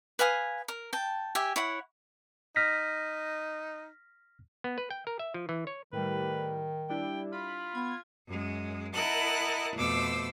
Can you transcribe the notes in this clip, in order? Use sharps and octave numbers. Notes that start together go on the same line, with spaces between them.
B4 F5 G#5 D#6
A#4
G5 A5
G4 E5 G#5
E4 C#5 F#5
D#4 F6 A#6 B6
B3
B4
G5
A#4
E5
F3
E3
C#5
A2 D#3 G3 B4
G3 D4 E4 G5
F4 B5
B3 G#6
F#2 G#3
E4 A#4 D#5 F#5 A5 F#6
F2 B2 A3 C5 D6 E6